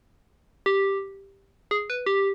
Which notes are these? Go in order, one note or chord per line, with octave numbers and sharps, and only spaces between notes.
G4
G#4
B4
G4